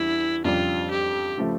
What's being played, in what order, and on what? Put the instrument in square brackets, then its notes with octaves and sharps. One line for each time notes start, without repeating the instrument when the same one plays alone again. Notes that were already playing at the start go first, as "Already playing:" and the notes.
Already playing: [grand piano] E2 C#3 G3 D4 [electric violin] E4
[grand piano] F2 C#3 G3 D4 G4 [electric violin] F4
[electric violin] G4
[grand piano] C#3 F3 A3